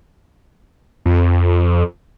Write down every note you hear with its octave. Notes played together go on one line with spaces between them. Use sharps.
F2